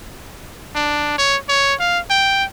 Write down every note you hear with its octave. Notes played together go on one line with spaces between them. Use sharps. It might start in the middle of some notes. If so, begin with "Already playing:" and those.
D4
C#5
C#5
F5
G5